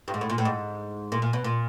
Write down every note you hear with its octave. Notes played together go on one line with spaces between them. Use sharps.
G2
G#2
A2
A#2
A2
G#2
A#2
A#2
B2
A#2